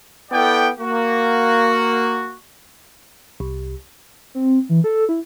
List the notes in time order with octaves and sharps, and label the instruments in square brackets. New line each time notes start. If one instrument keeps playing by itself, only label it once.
[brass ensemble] B3 E4 A4 D5 G5
A#3 F#4
[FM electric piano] C2
[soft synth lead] C4
E3
A4
E4